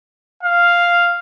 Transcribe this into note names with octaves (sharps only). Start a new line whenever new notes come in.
F5